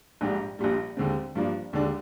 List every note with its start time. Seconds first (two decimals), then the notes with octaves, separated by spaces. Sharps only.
0.21 A#1 G#2 G3 D4 G4
0.59 A#1 A#2 G3
0.97 D#2 D3 G#3 C4
1.35 G2 F3 A#3 D4
1.73 D#2 D3 G#3 D4